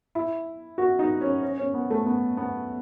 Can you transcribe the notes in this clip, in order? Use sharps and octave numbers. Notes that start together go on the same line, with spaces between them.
E4
F#4
D#4
C#4
C#4
C#4
B3
A3
B3
B3